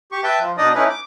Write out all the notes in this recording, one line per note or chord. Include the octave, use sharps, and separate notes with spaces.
G4 C#6
B4 E5 G5 A5 G6
F3
B2 D4 D#4 D5 D#5 D#6
A3 C#4 D#4 E4 B4
D6